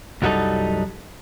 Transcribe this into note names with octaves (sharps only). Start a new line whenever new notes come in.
C2 F#2 F#3 G3 D#4 A4